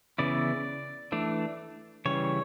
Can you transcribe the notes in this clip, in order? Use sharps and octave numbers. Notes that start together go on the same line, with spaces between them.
C#3 E3 B3 E4 D5
E3 A3 D4
C#3 E3 G3 C#5